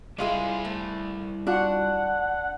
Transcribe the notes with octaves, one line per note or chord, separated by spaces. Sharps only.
G3 G#3 E4 F4 G#4 E5
A3
D4 F4 F#4 F#5